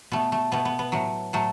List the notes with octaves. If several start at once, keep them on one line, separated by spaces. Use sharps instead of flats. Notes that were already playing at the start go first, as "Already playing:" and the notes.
B2 A3 B3
A3
B2 A3 B3
B3
B3
A2 F#3 A3
A2 F#3 A3